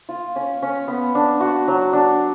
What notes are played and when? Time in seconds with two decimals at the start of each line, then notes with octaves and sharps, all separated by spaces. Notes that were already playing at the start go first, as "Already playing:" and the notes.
0.09 F4
0.36 C#4
0.62 C#4
0.88 B3
1.15 D4
1.40 F#4
1.68 F#3
1.93 D4